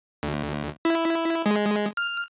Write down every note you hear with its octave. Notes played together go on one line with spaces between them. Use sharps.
D2
E4
G#3
F6